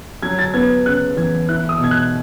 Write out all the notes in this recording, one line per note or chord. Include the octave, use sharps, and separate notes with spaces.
F#3 G#6
A6
B3 G#6
C#3 F#6
E2 G#6
E4 F#6
D#6
B2 G#6
F#6